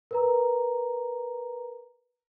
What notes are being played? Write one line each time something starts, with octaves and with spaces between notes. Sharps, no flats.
A#4 B4 A#5